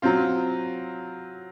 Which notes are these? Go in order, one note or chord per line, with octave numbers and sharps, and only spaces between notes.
F#3 C4 F4